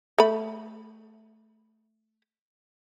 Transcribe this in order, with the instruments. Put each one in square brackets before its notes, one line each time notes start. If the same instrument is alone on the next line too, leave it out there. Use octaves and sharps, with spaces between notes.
[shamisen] A3 B5